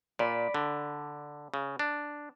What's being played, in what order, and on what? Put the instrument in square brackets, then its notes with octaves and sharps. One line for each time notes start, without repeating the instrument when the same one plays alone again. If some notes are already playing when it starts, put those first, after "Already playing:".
[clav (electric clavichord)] A#2 [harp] D5 B5
[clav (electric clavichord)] D3
C#3
D4